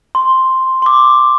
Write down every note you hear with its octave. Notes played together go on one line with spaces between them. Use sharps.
C6
C6
D6